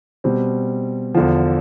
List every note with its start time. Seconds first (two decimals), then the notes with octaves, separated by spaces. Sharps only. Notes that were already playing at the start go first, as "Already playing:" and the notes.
0.24 B2 G3 C4
1.15 E2 D3 F3